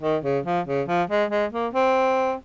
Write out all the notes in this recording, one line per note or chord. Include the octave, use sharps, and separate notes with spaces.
D#3
C#3
F3
C#3
F3
G#3
G#3
A#3
C4